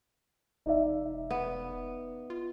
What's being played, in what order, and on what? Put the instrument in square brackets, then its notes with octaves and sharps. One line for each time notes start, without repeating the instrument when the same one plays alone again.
[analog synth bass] E1 [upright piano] D#4 D5 E5
[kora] B3
[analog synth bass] F4